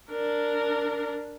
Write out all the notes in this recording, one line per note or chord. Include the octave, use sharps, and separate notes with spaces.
D4 A#4